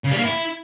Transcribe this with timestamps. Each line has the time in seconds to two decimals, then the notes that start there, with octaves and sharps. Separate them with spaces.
0.05 C#3
0.11 G3
0.18 A#3
0.24 E4